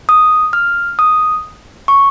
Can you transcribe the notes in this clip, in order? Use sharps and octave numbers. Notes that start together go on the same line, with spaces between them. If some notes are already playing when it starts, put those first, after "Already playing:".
D#6
F6
D#6
C#6